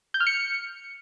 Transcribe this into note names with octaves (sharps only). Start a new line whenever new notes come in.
G6
F6
C#7